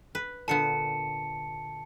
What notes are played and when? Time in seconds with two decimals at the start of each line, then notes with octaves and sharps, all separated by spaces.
0.15 B4
0.48 A#2 D3 B3 A5 C#7